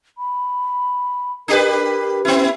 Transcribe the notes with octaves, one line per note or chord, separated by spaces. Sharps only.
B5
D4 G4 A#4 B4
B3 C#4 E4